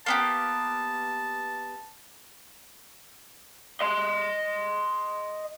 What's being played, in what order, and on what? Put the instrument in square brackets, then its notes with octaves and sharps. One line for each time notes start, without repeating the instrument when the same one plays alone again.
[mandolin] A#3 B3 G4 [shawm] A5
[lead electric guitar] D#5 C6